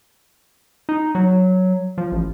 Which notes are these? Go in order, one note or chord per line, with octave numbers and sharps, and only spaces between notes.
D#4
F#3
F3
A1